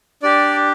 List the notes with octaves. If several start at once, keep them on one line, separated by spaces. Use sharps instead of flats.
D4 G4 D5